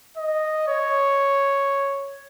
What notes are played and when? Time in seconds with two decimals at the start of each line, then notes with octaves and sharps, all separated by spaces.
0.17 D#5
0.68 C#5